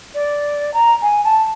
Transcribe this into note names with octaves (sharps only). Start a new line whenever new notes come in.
D5
A#5
G#5
A5